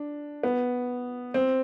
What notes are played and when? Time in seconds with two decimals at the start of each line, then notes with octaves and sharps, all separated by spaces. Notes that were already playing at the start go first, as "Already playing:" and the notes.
Already playing: D4
0.43 B3
1.34 C4